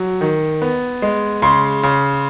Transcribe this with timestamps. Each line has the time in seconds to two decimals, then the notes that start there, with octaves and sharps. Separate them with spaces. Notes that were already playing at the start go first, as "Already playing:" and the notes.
Already playing: F#3
0.21 D#3
0.62 B3
1.02 G#3
1.42 C#3 C6
1.83 C#3